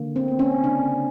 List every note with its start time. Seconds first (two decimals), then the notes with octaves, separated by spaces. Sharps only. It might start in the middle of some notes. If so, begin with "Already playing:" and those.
Already playing: D3 A#3
0.16 C4
0.28 B3
0.39 C#4
0.64 C#3 D4